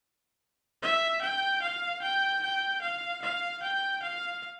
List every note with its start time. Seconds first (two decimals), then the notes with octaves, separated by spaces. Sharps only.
0.82 E5
1.21 G5
1.62 F5
2.02 G5
2.43 G5
2.82 F5
3.22 F5
3.63 G5
4.03 F5